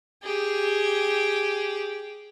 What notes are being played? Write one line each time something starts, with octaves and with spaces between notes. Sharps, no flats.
G4 G#4